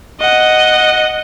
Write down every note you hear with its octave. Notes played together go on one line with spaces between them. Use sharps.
D#5 F#5